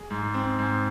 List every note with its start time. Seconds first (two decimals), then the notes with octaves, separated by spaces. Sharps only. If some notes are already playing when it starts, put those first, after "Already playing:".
Already playing: G#4
0.10 G#2
0.34 C4
0.59 G#2